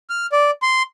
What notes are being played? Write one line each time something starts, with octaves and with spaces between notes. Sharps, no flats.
F6
D5
C6